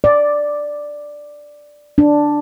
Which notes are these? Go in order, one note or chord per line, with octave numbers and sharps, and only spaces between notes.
D5
D4